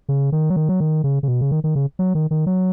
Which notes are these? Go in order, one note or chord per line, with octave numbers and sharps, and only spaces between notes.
C#3
D#3
F#3
D#3
F#3
D#3
C#3
C#3
B2
C#3
D#3
D#3
C#3
F#3
D#3
D#3
F#3